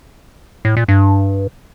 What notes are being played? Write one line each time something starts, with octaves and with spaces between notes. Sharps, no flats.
A2
A#2
G2